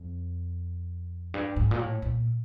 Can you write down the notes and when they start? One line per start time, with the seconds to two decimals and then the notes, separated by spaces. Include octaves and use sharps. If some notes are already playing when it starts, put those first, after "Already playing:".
Already playing: F2
1.34 G2
1.56 G#2
1.71 A#2
1.79 A2
2.02 A#2